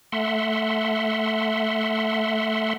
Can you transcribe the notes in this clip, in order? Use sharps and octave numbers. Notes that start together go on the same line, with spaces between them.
A3 E5 F#5 C6